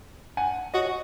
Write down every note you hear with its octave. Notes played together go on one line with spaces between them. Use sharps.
F#5 G#5
F#4 C#5 D#5